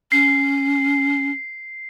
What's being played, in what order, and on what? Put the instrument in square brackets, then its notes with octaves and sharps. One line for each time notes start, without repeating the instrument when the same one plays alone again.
[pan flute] C#4 [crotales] C7